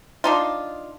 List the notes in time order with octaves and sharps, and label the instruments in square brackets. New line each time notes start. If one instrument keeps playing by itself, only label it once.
[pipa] D4 D#4 F4